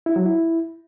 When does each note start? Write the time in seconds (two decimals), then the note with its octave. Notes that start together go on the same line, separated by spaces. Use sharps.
0.06 E4
0.16 F#3
0.26 E4